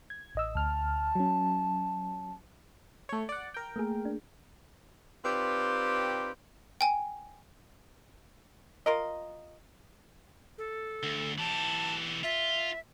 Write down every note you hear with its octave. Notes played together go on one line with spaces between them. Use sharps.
G#6
A1 D#5 E6
D2 A5 F6
F#3 C#4
A3 C#5
D5 F#5
A#4 G5
A3 A#3 G#4
D4
C4 D#4 F4 G4 B4 D5
G5 G#5
F4 A#4 D#5
A4
D2
E3 G4 A5
F4 E5